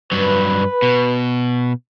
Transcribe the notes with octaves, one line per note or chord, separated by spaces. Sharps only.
G2 F#3 B4
B2